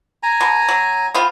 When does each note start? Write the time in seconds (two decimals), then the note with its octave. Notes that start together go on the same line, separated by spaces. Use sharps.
0.23 G#5 A#5
0.41 B2
0.68 F#3
1.14 B3 C4 F4